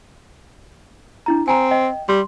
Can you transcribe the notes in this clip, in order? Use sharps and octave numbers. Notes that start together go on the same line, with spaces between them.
D4 E4 A#5
C4 G#5 A#5
D#5 G5
G3 C6